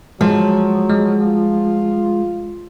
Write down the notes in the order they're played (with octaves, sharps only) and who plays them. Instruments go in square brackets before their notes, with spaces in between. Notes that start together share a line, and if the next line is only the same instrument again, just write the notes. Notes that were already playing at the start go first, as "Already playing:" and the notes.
[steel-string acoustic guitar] F3 [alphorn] F#3 [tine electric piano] G#3
[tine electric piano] G#3
[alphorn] F4